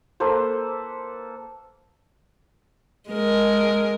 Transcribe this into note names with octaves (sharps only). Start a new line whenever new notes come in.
A#3 A4 B4 C5
G#3 A#4